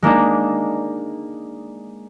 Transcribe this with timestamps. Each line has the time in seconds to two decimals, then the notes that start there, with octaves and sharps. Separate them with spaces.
0.02 G#3 A#3 D4 D#4